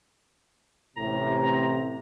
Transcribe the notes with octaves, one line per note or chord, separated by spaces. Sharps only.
A1 A2 C3 A#5